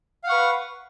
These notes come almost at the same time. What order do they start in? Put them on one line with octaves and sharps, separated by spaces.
F5 F#5 C#6 B4